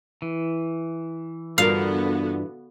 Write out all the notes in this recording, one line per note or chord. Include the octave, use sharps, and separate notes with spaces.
E3
G2 D3 B3 F4 F#4 A#4 F5